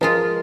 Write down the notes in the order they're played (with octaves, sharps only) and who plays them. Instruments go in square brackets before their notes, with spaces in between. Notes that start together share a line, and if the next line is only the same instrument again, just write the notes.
[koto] F3 G#3 F4 [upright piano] A#4